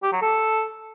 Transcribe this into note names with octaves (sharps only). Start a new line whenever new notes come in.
G4
F#3
A4